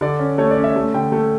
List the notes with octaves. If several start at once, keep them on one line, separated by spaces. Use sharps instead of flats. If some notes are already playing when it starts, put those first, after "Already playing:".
D3 D5
C#4
A3 C#5
D5
C#4
E5
A3
D3 G5
A3